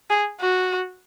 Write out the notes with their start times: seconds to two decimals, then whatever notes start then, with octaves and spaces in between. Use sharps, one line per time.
0.10 G#4
0.40 F#4